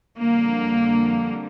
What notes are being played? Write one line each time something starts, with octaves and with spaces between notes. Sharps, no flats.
F2 D3 G3 A#3